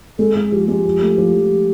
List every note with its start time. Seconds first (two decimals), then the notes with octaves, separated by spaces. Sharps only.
0.18 G#3 A4
0.35 G#3 G#4
0.52 F3 G4
0.68 G#3 G4
0.85 F3
1.01 A3
1.18 F3
1.34 F3